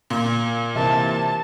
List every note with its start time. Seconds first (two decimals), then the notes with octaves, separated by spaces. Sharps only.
0.10 A#2
0.75 C3 E3 A#4 A5